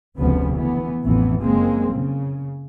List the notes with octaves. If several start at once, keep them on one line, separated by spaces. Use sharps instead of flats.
F1 D2 C#3 F3 B3
E3 B3
A1 F2 E3 B3
F#1 G#3 A#3 C4
C#3